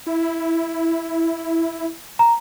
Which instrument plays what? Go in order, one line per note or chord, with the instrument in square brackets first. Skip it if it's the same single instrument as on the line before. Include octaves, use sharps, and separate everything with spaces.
[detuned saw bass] E4
[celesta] A#5